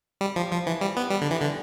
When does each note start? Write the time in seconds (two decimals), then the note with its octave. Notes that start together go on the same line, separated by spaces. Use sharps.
0.21 G3
0.36 F3
0.51 F3
0.67 E3
0.81 G3
0.97 B3
1.11 G3
1.22 D3
1.31 E3
1.42 D3